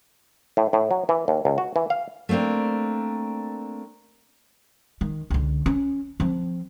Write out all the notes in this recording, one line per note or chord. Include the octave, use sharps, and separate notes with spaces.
A2
A2
F#3
E3
D#2
C#2
F#4
E3
F5
A3 A#3 C4 D4 A#4
D#3
C#2 D3
C#4
F3 C4